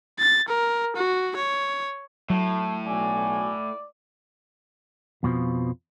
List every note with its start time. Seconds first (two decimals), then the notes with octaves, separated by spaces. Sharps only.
0.19 A6
0.49 A#4
0.96 F#4
1.36 C#5
2.30 A2 F#3 A3
2.86 B1 F#4 D5 G#5
5.23 F2 B2 D3 F3